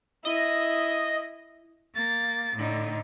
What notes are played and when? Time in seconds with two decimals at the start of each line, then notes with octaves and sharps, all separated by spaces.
0.25 E4 D#5
1.94 A#3 A6
2.55 A2 D3 D#4